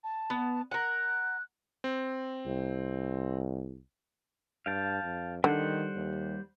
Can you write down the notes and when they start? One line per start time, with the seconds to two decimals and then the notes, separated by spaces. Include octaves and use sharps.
0.04 A5
0.30 B3
0.71 A#4 F#5 F#6
1.84 C4
2.47 C2
4.66 G2 F5 G5 A5
5.03 F2
5.44 D3 D#3 G3 C5 F#5
5.95 D#2